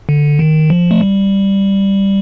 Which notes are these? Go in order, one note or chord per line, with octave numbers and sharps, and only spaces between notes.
D3
D#3
F3
A3
G3